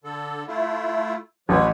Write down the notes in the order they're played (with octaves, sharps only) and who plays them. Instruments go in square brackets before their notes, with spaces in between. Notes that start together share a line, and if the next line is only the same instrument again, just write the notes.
[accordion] D3 A4
A3 E4 F4
[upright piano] A1 [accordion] F3 B4 C#5